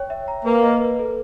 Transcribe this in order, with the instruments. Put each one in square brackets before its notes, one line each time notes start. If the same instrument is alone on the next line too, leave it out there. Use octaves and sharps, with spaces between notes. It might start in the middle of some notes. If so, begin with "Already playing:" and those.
Already playing: [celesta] C#5 G5
E5
A#5
[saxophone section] A#3 [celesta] B4
[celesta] D#5
B4
A4